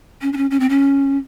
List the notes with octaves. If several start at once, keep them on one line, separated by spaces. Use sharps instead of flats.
C#4
D4
C#4
C#4
C4
C#4